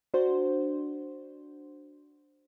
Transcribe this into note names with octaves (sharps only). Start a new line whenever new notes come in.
D4 F#4 C5